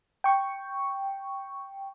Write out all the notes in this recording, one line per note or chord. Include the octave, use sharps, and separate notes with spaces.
G5 C#6